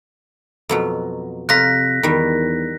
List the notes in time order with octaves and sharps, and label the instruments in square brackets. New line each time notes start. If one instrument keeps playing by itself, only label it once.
[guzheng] F2 B2 F#3
[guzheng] F2 F4 A#5 [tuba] C3 [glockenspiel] F#6 A#6 B6
[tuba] E2 [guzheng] D#3 G3